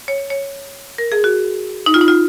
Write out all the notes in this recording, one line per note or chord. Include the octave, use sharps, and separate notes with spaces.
C#5
C#5
A#4
G#4
F#4
D#4
F4
D#4
F4